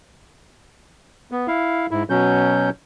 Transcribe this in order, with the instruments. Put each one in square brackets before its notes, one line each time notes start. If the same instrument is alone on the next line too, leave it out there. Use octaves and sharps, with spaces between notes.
[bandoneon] B3
E4 F5
G#2 E4
B2 F#3 C#4 G6